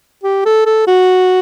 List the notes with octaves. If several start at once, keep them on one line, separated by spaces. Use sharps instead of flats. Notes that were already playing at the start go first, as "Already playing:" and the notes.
G4
A4
A4
F#4